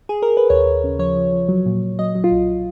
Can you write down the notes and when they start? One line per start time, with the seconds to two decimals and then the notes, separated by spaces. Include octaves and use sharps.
0.09 G#4
0.22 A#4
0.37 B4
0.50 D#2 C#5
0.66 D#2
0.84 C#3
0.99 F3 C#5
1.16 F3
1.33 F3
1.49 F#3
1.66 A#2
1.83 A#2
1.99 F#3 D#5
2.15 F#3
2.24 F4
2.32 B1